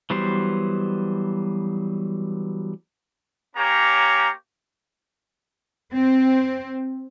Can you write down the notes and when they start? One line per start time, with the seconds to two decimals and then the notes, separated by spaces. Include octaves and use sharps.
0.10 E3 F#3 G3 B3 C5
3.56 A#3 C#4 G4 C#5 A#5
5.93 C4